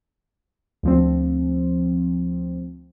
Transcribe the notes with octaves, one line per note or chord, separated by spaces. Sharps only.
D2 F3 C4